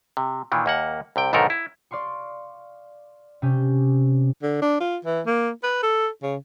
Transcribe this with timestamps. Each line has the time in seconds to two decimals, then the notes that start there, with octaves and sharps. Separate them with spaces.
0.17 C3
0.52 A#2 D#3 E3
0.66 D#2 A#3 F#5
1.16 C2 C3 G5
1.33 B1 G#2 D3 D#3 A4 A#4
1.50 E4
1.91 D5 F5 C6 C#6
3.42 C3 C#4 G6
4.43 D3
4.62 D4
4.80 F4
5.05 E3
5.26 A#3
5.63 B4
5.83 A4
6.23 C#3